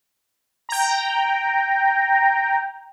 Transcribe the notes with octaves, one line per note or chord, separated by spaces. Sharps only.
G5 A#5